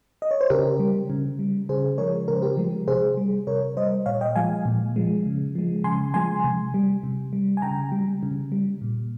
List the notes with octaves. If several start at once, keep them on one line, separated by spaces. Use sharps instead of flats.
D#5
C#5
C5
C#3 G4 A#4
G3
C#3
G3
C#3 G#4 C5
F3 G#3 A#4 C#5
C#3 A#4
C5
G4 A#4
F3 G#3
C3 G#4 C5
G3
C3 A#4 C#5
G3 C5 D#5
A#2 C#5 F5
D#5 G5
F3 G#3 F5 G#5
A#2
F3 G#3
C#3
F3 G#3
C#3 G#5 C6
F3 G#3 G#5 C6
C3
G3
C3
G3
G#5
C#3 G5 A#5
G3
C#3
G3
A#2